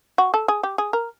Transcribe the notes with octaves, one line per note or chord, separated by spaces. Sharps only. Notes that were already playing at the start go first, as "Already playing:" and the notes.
F#4
A4
G#4
G4
G#4
A#4